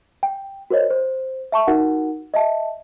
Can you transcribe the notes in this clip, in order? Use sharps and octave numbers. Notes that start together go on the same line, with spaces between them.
G5
F#4 A#4 C5 C#5 D#5
C5
E5 A5 C#6
D#4 F#4 A#4 F#5
D#5 E5 A5